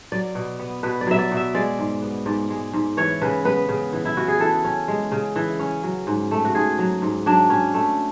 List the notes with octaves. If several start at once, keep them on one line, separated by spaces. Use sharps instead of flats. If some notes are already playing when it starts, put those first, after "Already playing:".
F#3 D5
B2
B3
B2 B4
D5
F#3 E5
D5
B2
E5
G#3 D5
G#2
B3
G#2 D5
G#3
G#2
E3 C#5
C#3 B4
B3 B4
C#3
E3
E4
C#3 F#4
G#4
E3 A4
C#4
G#3
C#3
E3
C#4
F#3
G#2
A3
F#4
G#2 G#4
F#3
G#2
F#3 D4
C#4
A3